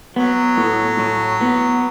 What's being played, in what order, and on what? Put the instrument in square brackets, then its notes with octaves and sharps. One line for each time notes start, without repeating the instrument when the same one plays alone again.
[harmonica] F#3 [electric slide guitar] B3
[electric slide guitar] A2
A2
B3